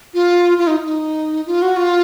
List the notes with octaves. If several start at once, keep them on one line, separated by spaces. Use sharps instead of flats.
F4
F4
D#4
D#4
F4
F#4
F4